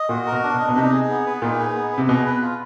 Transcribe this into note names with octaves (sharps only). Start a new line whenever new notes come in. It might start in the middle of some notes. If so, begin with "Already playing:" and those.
Already playing: D#5
A#2 F#4
A#4
B2
D4
B2
D#5
B2
C3 D#4
G#4
B3
B4
A#2 D#4
G#4
B3
B4
C3
B2 G#4
B4
F4